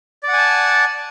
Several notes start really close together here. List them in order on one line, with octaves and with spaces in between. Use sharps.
D5 F#5 G#5 A5